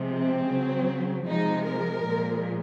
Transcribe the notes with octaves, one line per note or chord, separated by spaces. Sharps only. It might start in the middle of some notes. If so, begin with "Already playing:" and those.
Already playing: C3 F3 G#3
C4
C#3 F#3
C3 F3 G#3 D#4
A#4
A#2 F3 G#3